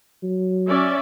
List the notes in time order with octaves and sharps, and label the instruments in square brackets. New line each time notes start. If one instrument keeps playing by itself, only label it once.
[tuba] F#3
[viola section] C#4 D5 E5